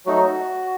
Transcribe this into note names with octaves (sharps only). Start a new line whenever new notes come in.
F#3 A3 D#4 F#4